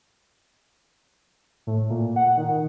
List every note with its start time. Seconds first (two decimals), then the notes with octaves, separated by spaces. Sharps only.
1.67 A2
1.90 A#2
2.16 F#5
2.37 D#3